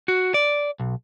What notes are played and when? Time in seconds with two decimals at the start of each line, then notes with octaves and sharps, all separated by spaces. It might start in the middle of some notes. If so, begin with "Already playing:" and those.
0.08 F#4
0.34 D5
0.80 B1